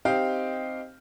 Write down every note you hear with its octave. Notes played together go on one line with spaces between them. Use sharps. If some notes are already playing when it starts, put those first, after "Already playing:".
C4 D#4 G4 D#5 F5 G5